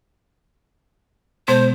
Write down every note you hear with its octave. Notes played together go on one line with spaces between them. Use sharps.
B2 G#3 B3 C5